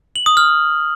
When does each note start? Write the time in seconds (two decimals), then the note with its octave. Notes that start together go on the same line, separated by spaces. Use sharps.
0.16 F#7
0.26 D#6
0.37 F6